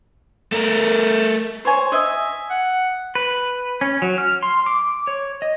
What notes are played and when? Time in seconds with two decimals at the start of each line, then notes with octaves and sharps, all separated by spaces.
0.52 A3 A#4
1.65 C5 C#5 G#5
1.92 D#5 E5 G#5
2.50 F#5
3.15 B4
3.81 C#4
4.02 F#3
4.18 F6
4.43 C6
4.66 D6
5.07 C#5
5.42 D#5